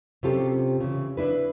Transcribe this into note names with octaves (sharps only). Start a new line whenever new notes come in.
C3 C#4 F4 G4 A4
C#3 E3
D4 E4 B4